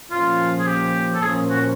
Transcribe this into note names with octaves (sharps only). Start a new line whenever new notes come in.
A#2 F3 A#3 C#4 F4
G#4
G4
A4
A#2 F3 A#3 C#4 G#4
F#4